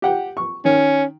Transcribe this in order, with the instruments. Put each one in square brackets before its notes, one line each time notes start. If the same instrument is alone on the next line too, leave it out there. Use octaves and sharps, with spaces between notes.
[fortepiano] G4 F#5 G5
C#6
[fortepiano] D#3 [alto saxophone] C#4